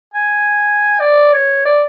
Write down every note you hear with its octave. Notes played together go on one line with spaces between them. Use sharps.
G#5
D5
C#5
D5